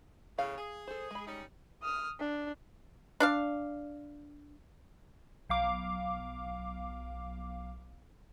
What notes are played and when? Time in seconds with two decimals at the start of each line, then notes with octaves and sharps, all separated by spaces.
0.39 E2 A2 C#3 F5
0.58 G#4
0.88 A4 C5
1.11 G#3 B5
1.27 G3 C#4 D#4
1.83 D#6 F6
2.20 D4
3.20 D4 D5 F5
5.49 B1 F5 D6